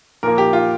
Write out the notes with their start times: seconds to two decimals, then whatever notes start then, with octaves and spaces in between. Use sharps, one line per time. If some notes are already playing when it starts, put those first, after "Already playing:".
0.23 A#2 F3 A#3 A#4
0.38 G4
0.53 F4